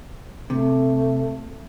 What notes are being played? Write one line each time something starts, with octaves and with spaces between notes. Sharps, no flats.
C3 A3